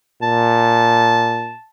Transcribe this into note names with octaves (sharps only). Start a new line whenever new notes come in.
A#2 A5